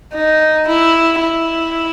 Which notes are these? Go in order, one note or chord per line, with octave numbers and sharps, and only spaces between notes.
D#4
E4
E4